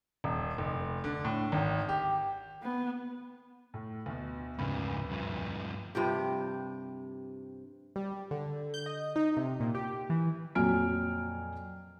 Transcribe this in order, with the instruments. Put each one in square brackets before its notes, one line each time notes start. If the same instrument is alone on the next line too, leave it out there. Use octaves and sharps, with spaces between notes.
[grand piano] D#1
F1
D3
A2
G#1
G4
[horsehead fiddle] B3
[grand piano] A2
D2 B2
[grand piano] F1 D2 B5 [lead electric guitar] G#2 C#3
[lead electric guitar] G2 F3
[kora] G2 C3 F3 G4
[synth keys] G3
D3
G6
D#5
D#4
C3
A#2
G4
E3
[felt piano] F2 A#2 F#3 G#5 F6 D7